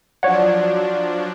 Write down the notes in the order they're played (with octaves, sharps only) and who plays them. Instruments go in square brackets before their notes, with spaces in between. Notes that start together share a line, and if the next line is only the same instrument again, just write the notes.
[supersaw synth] F3 F#3 D4 [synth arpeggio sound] C#5 F#5 [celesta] D5